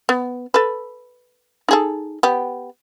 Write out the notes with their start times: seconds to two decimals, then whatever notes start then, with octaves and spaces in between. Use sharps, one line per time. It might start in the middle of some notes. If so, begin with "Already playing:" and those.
0.09 B3
0.54 A4 B4
1.69 D#4 G#4 A4
2.23 B3 G4